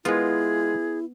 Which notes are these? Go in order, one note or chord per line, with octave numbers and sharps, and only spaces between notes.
G#3 B3 E4 F4 G#4